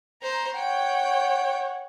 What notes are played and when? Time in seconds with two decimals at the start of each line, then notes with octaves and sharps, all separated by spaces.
0.22 C5 A#5
0.55 C#5 F#5 G5